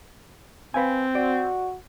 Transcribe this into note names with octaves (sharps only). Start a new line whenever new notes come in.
C4 B4 F5 G#5
F#4 D5